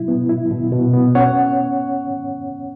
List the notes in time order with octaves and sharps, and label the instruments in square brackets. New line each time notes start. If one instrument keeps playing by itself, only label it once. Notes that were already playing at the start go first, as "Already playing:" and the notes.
Already playing: [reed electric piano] B2 F#3 E4
B3
E4
B2
B2
B3
C#4 C#5 F#5